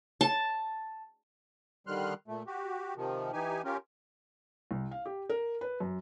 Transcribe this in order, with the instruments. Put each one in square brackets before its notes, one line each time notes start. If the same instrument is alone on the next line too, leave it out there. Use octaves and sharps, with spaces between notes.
[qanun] A5
[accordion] D3 D#3 G3 C6 F6 F#6
A#2 A3
F#4 G4
C3 D#3 F3
E3 D#4 G4 G#5
C#4 F4 G4 A#4
[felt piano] C2
F5
G4
A#4
B4
F#2